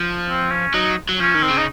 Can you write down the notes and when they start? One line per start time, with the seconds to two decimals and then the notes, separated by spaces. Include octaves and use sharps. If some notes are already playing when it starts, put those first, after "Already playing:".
Already playing: F3
0.28 C4
0.51 C#4
0.74 F#3 D#4
1.09 F#3
1.20 F3 C#4
1.35 D#3
1.42 C4
1.50 C#3
1.57 D#4